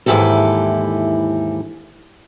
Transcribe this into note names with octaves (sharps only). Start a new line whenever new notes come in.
D#2 G#2 E3 E4 G4 A4